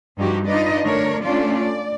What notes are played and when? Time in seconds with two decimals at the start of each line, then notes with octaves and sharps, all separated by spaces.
0.17 G2 F3 G3 D#4 F#4 G4
0.47 D4 D#4 F4 B4 D5 D#5
0.85 D3 A3 D4 A#4 C#5
1.21 A3 C#4 D4 F4 D5
1.56 D5